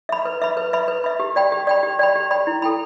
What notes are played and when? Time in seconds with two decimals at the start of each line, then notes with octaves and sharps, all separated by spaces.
0.09 E5 B5
0.25 B4
0.42 E5 B5
0.57 B4
0.73 E5 B5
0.88 B4
1.04 E5 B5
1.20 G4
1.36 D5 G5 B5
1.52 G4
1.67 D5 G5 B5
1.83 G4
1.99 D5 G5 B5
2.16 G4
2.31 D5 G5 B5
2.47 E4
2.62 A4 G5 B5